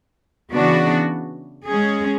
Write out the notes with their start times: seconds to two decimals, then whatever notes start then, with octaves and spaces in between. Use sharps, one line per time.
0.53 C#3 E3 B3 D4 F#4
1.66 G#3 C#4 G#4